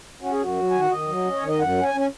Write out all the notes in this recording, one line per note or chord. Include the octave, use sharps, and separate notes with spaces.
C#4 F#4
G#4
F#2 F#4
F#3
D#3 G#5
F#5
D#3 D#5
F#3
C#4
C#5
D#3
D#5
F#2 F#5
C#4
G#5
C#4
G#5